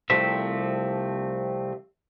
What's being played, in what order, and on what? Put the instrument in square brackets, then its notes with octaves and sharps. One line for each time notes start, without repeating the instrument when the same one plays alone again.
[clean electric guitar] C2 C3 F3 A3 C4 E5